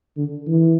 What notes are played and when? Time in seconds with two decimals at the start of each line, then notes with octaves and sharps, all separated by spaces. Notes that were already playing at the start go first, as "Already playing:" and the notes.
0.17 D3
0.47 E3